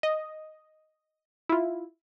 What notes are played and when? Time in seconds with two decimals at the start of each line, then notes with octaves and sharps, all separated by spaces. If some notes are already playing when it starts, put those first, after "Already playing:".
0.03 D#5
1.49 E4 F4